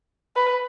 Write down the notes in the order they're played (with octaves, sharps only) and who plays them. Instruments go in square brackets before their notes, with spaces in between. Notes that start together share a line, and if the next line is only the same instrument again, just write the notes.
[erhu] B4